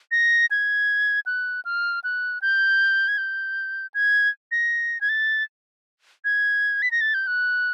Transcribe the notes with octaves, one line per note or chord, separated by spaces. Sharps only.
A#6
G#6
F#6
F6
F#6
G6
G#6
G6
G#6
A#6
G#6
A6
G#6
B6
A#6
A6
G6
F#6